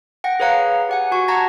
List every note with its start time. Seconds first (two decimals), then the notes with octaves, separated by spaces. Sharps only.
0.24 F#5 G5 A#6
0.40 G#4 B4 C#5 F5 A#5 C#7
0.89 G4 F#5 G#5
1.12 F#4 C#6
1.28 F#5 A5 A#5 G#6 A#6